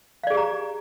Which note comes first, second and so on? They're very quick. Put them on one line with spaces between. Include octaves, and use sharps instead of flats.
F5 D5 G#4 G4 A#5